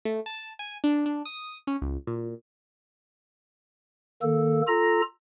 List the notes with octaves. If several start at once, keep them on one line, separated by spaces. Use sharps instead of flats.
A3
A5
G#5
D4
D4
D#6
C#4
C#2
A#2
D#3 A#3 A4
F4 A4 A#5 A#6